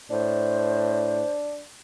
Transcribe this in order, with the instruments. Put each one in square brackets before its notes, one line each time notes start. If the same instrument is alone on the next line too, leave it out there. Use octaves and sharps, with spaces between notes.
[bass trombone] A2 [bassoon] D4 [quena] C5